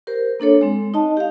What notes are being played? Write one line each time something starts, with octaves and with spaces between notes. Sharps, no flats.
G4 A#4 C5
A#3 D4 A4 C#5
G#3 C4
D#4 D#5 A5
G4 F5